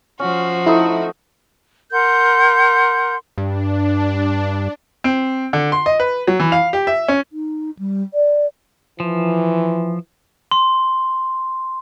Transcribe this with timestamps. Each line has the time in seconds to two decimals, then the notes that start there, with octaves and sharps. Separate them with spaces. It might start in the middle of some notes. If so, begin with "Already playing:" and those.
0.19 F3 C#4 F#4
0.66 A3 D#4 E4 A4
1.92 A#4 F#5 C6 G6
3.38 G2 D4
5.04 C4
5.53 D3
5.72 C6
5.86 D#5
6.00 B4
6.27 F#3
6.40 E3
6.52 F5
6.73 G4
6.87 E5
7.08 C#4
7.32 D#4
7.79 G3
8.14 D5
9.00 E3 F3
10.51 C6